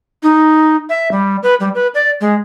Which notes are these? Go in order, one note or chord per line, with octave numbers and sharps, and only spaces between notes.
D#4
E5
G3
B4
G3
B4
D5
G#3